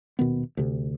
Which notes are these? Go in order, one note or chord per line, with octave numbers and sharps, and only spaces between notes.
D#1 B2 D#3 B3
D2 C3